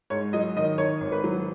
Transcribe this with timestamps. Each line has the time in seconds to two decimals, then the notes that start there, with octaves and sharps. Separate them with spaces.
0.10 G#2 C#5
0.33 F#3 D#5
0.57 D#3 D#5
0.78 D#3 C#5
1.01 G#1
1.12 B4
1.24 F#3